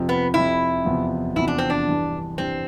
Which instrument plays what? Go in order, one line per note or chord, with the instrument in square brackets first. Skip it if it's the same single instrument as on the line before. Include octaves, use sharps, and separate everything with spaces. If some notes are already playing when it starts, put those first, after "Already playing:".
Already playing: [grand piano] F2 C3 F3
[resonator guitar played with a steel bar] B3
[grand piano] F2 C3 F3 [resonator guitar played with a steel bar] E4
[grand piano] E2 C3 F3 B3
[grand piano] E2 C3 F3 B3 [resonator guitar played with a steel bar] E4
[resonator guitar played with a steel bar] D4
C4
D4
[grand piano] G2 E3 G3
[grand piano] G2 E3 G3 [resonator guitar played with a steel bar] C4